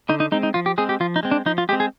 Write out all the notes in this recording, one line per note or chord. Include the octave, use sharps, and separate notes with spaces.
D3 D#4
D#4
G#3 C4 D#4
D#4
F3 F4
G4
G#3 C4 G#4
G4
F3 F4
D#4
G#3 C4
D4
F3 D#4
F4
G#3 C4 G4
G#4